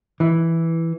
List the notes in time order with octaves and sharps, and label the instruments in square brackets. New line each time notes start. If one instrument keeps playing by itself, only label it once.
[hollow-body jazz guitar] E3